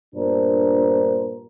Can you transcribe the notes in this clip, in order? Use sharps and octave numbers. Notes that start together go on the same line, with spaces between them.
G2 A#2 B3 D4 A#4 C5